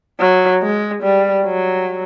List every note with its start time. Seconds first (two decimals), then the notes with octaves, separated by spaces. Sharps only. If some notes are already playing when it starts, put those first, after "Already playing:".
0.20 F#3
0.62 G#3
1.03 G3
1.45 F#3